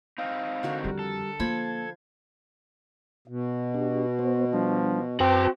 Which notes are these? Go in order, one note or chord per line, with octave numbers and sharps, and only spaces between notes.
C4 D#4 F5
D3 F#4 A#4
F2 D#3 G3
A4
F3 A#3 B5 C6 G#6
B2
D4 G4
B3 C5
F3 G3 D4
F#2 C4 F#4 B4 G5 A5